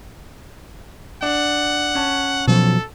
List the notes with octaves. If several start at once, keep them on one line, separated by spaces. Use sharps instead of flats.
D4 F#5
C#4 A5
B2 F3 F#3 A4